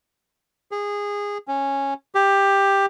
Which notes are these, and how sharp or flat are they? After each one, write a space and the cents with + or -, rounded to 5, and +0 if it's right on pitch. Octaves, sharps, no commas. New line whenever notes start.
G#4 -20
C#4 -10
G4 +10